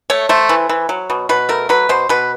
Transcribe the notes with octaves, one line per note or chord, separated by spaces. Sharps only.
A3 C#5
A3 C5
E3
E3
F#3
B2
B2 B4
A3 A#4
F#3 B4
B2 C5
B2 B4